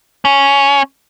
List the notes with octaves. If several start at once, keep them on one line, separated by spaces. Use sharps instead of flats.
C#4